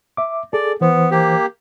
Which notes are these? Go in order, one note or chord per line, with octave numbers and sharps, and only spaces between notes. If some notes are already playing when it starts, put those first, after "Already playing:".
E5 D6
G#4 A4 D5
E3 B3 C5
A#3 G4